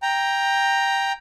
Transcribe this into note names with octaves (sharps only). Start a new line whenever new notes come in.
G5 A#5